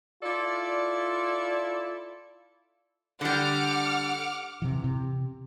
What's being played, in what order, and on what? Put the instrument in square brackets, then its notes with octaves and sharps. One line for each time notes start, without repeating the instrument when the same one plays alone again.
[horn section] E4 F4 A4 D5
[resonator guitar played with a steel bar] D3 G3 [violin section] F#5 D6 F6
[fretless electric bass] C3 E3
C3